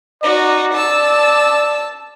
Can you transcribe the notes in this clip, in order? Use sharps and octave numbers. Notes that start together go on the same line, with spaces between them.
D#4 F#4 D5
A5 E6